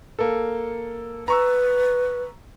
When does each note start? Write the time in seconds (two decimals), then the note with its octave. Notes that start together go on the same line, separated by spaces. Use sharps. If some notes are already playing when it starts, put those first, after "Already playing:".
0.19 A#3 A4
1.28 B4 A#5 C#6 E6